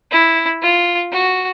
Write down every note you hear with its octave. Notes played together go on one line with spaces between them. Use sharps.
E4
F4
F#4